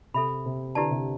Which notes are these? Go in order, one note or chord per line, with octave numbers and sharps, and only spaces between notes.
C3 A4 E5 B5
C3
D3 E4 G4 B4 D5 A5
C3